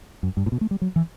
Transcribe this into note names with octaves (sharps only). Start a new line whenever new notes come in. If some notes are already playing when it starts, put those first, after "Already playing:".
F#2
G2
A2
B2
A3
G3
F#3
E3